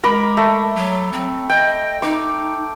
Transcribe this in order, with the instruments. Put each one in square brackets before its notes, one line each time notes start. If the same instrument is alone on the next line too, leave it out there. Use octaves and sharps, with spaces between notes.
[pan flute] G#3 [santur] A#4 B5 D6
[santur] A3
[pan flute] F#3
C4
[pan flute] D#5 [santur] G5
[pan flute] D#4 [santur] D6